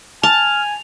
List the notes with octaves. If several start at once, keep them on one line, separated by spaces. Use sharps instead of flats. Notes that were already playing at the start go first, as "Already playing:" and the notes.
G#5 A5 F6 F7